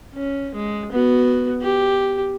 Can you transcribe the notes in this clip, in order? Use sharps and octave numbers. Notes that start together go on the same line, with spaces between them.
C#4
G#3
B3 F#4
G4